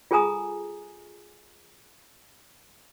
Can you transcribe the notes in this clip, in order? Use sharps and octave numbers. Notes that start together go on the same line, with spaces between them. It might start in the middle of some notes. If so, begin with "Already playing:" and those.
F4 G#4 A4 G#5 A#5 D#6